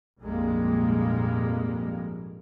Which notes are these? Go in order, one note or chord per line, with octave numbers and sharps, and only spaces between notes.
A#1 F2 G#2 G3 G#3 A#3